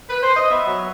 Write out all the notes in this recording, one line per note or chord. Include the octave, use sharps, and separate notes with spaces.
B4
C5
D#5
B3 E5
F#3